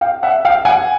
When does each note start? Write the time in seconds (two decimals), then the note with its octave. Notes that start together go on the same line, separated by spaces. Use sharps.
0.01 F5 G5
0.23 E5 F#5
0.45 F5 G5
0.65 F#5 G#5